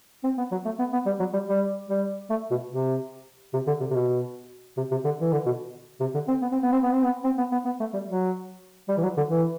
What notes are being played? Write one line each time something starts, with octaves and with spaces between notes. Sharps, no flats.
C4
B3
F#3
A3
B3
B3
G3
F#3
G3
G3
G3
A3
B2
C3
C3
D3
C3
C3
B2
C3
C3
D3
E3
D3
B2
C3
D3
C4
B3
C4
B3
C4
B3
C4
B3
C4
B3
B3
B3
A3
G3
F#3
G3
E3
F#3
D3
E3